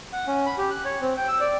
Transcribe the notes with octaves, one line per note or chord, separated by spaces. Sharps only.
F#5
C#4
B5
G4
F#6
C#5
C4
G5
E6
D5